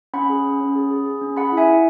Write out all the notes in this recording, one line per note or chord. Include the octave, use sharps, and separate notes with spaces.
C#4 F#5 B5
G#4
C#4
C#4
G#4
G#4
G#4
C#4
G#4 F#5 B5
E4
E5 G#5
E4